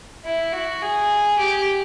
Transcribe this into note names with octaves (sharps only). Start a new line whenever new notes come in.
E4
F#4
G#4
G4